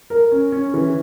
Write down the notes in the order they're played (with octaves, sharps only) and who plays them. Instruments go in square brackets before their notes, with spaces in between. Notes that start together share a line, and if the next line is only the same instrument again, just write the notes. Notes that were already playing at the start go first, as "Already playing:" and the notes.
[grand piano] A#4
C#4
C#4
E3